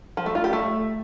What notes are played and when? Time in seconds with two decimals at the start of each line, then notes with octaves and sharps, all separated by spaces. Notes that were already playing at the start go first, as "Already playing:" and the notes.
0.17 F3
0.26 A3
0.35 F4
0.44 G4
0.53 A3